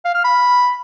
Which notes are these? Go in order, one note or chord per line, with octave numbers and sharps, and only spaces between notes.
F5
F6
B5